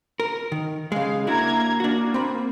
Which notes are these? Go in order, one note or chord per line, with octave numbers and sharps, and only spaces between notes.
A#4
D#3
C#3 G#3 G#4 F5
A#3 D4 E4 F#4 A#5 G#6
A#3 D4 F#4
C4 B5